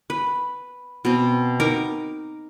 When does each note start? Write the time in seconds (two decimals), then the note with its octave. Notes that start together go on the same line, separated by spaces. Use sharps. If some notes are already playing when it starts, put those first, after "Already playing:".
0.10 B4
1.05 B2 C4
1.60 D#4 A#4 D6